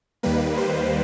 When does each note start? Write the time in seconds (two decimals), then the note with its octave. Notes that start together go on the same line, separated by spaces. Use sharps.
0.23 D#2 D#3 G3 A#3 B4
0.57 C5